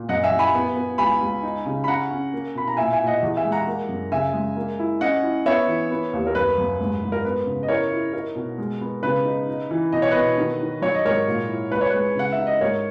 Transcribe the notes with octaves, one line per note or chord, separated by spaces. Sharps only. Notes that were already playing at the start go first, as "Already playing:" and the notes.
Already playing: A#2
F#2 D#5 F#5
E5 G#5
F#2
G#5 B5
B3
B3
C#2 G#5 B5
C#2
D#4
C#3
B5
C#4 F#5 A#5
C#4
A#3
B2 B5
A#5
A#2 E5 G#5
E5 G#5
A#2
D#5 F#5
E2
E5 G#5
G#3
F#5 A#5
A#3
F#2
C#3 E5 G#5
G#3
A#3
E4
C#4 D#5 F#5
E4
B3 C#5 E5
E3
B3
D#2
A#4
F#2 B4
F#2
G#2
G#2
A#4
B3 B4
C#3
D#5
E4 A#4 C#5
E4
D#4 A#4
B2
G#3
B3
C#3 B4
D#4
D#4
E3
B2 D#5
C#5
B2 B4 D#5
D#3
D#3
F#3 C#5
D#5
G#2 A#4 C#5
A#2
E4
C#2 B4
C#5
G#3 B4
C#3 F#5
E5
D#4
D#5
G#2 A#4 C#5